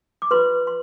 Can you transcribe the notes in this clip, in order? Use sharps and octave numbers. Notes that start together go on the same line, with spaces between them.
D6
F4 B4 C6
C6